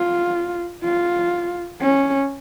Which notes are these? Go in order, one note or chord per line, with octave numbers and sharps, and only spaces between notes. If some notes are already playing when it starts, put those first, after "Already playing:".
Already playing: F4
F4
C#4